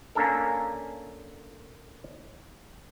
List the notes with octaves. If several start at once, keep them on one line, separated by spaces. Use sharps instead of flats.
A#3 C#4 D4 A4 A#4